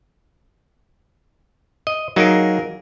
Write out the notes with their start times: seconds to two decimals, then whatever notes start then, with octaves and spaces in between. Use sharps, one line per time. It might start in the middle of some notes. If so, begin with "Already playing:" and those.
1.87 D#5
2.16 F#3 A#3 D#4 G#4 A#4